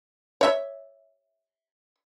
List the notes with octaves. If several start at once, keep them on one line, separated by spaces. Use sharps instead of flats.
C#5 E5